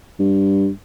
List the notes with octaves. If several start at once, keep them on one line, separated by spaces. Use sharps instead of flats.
G2